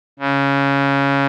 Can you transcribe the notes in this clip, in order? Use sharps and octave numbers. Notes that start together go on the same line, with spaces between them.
C#3